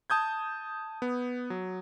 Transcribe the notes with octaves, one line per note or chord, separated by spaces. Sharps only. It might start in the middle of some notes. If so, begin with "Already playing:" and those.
A5 D#6 G6 G#6
B3
F#3